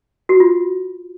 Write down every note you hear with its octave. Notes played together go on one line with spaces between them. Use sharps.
F#4
F4